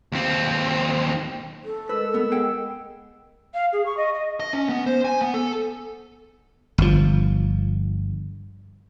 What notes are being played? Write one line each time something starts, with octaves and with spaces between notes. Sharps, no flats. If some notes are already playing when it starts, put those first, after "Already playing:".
D#2 C4
A4
G#3 A#4 B4 D#5 E6
B3
G#4 F#5 G5
F5
G#4
C#6
D#5
D#5
D#5
C#4
B3
C5
G#5
B3
A4
G1 F3